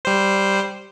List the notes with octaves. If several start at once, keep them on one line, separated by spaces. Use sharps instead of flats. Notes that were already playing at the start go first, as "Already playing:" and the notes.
G3 C5